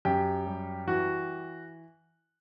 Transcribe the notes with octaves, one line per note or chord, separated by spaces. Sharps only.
F#2 G4
G3
E3 F#4